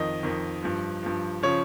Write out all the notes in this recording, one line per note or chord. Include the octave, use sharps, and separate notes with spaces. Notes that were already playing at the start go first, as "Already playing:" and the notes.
Already playing: F2 D#3 D#5
F2 D#3
G2 F3
G2 F3
C#3 F3 C#5